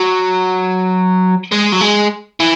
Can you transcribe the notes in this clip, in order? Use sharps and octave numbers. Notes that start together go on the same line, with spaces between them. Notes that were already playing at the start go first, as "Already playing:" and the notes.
Already playing: F#3
G#3
F#3
G#3
E3